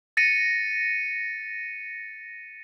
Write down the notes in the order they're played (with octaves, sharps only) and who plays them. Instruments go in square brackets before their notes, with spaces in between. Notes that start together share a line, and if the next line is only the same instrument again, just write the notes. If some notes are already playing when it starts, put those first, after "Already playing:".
[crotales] A6 A#6 C#7 D#7